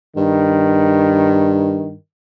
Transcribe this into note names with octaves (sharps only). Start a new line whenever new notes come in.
G2 D#3